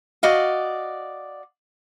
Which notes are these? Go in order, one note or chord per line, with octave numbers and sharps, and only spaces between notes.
F#4 D5 D#5 F5